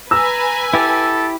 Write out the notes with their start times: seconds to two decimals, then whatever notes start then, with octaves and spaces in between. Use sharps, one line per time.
0.11 B4 G#5 A#5 E6
0.74 E4 G4 A4